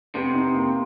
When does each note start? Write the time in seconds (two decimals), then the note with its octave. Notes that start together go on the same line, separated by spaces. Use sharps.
0.15 C3 B3
0.35 D#4
0.55 A#3